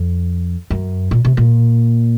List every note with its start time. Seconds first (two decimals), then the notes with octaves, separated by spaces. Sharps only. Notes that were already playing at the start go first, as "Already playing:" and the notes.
Already playing: F2
0.70 F#2
1.11 A#2
1.25 C3
1.37 A#2